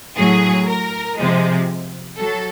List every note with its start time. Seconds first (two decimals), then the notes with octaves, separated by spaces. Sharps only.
0.16 A2 F#3 G#4
0.68 A#4
1.18 C3 F3 G#3
2.19 F#3 A4